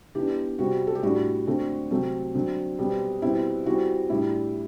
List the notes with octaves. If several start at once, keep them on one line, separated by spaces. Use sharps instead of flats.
E3 B3 D4 G4
C3 G3 C4 F#4
A4
G4
A2 G3 D4 F#4
D3 A3 C4
C3 F#3 A3 C4
D3 F#3 C4
B2 G3 C4
B2 G3 C4 E4
E3 G3 C4 F#4
A2 G3 D4 E4